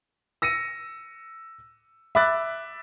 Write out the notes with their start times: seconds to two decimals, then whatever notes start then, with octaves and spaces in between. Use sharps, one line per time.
0.42 E6 A#6 C#7 D#7
2.15 E5 B5 D6 F#6 A6